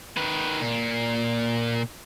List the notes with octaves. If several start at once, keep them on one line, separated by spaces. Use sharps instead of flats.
D#3 B4
A#2